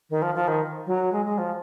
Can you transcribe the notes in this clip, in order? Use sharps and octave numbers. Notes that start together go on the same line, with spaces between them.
D#3
F3
F3
D#3
F#3
G#3
G#3
F3